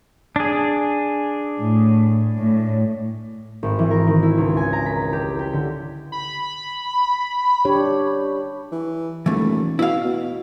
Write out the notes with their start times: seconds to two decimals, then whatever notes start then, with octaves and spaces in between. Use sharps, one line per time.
0.36 D4 G#4
1.59 A2
2.36 A2
3.63 G#1
3.79 E3
3.91 A#4
4.07 D#3
4.22 E4
4.37 C#2
4.57 G#5
4.73 A#5
4.86 B6
5.13 G4
5.39 G4
5.53 D3
6.12 B5
7.65 D4 G4 C#5
8.72 E3
9.26 D#1 E3 A3
9.79 B2 E4 F5
10.04 B2